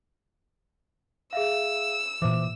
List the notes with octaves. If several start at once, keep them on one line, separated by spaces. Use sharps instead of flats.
G#4 E5 F5 E6
A#2 E3 C5 E5 D6